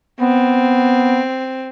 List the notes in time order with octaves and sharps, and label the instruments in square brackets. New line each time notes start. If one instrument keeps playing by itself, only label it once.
[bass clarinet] B3 [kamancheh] C4